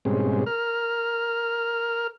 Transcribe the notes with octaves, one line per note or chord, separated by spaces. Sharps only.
G#2 B2 G3 G#3 C4 C#4
A#4 F6